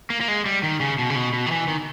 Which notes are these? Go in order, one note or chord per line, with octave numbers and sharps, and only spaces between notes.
A#3
A#3
G#3
G3
D#3
C#3
B2
C#3
B2
B2
D#3
E3
D#3